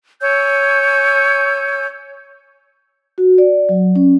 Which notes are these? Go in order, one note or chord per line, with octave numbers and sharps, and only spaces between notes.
C#5 G#5 E6 G6
F#4
D5
F#3
C#4